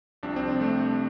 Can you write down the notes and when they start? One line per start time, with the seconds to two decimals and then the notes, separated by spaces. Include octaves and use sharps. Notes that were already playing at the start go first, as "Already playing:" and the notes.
0.23 C2 C3 F3 D4
0.36 C4
0.48 D4
0.61 A3